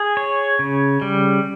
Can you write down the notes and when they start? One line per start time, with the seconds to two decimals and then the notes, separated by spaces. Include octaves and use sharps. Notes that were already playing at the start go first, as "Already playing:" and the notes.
Already playing: G#4
0.17 C#5
0.59 C#3
1.02 G3